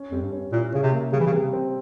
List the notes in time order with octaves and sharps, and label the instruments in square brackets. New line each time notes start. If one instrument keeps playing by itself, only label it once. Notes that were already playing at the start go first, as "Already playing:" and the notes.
Already playing: [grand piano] C#4
[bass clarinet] F2 [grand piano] G3
[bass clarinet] G2
[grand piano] C#4
[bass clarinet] A#2 [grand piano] E4
[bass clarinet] C#3 [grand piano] C#4
[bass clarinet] C3
[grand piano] A#3
[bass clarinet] C#3 [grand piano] G3
[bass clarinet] E3
C#3
[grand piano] C3
C4